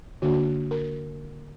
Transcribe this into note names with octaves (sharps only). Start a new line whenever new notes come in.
D3 A#3 D4 F#4
A#4